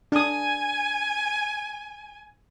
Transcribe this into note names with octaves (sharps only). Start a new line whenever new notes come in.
D4 G#5 D#6